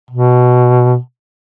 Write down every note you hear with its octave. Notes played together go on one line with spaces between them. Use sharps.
B2